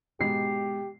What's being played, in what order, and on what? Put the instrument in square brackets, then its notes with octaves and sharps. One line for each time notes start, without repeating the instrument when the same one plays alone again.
[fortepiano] G#2 B2 [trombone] G4 [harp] C7